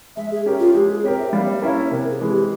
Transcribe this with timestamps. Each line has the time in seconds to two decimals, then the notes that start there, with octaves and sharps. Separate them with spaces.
0.17 G#3 E5
0.31 G#4
0.46 C#4 G4 A#4
0.60 F4
0.75 G#3 G4
0.89 G#4
1.04 C4 G4 A#4 C#5
1.18 E5
1.32 G3 F5
1.45 C#5
1.52 E5
1.62 A#3 C#4 E4 A#4
1.72 C#5
1.91 C3 A#4
2.10 G#4
2.20 E3 G#3
2.30 G4